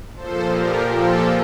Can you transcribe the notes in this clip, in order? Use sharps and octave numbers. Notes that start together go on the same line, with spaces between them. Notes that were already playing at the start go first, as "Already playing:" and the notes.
A#2 F3 A4 C5
G4 A#4
A#2 F3 F4 A4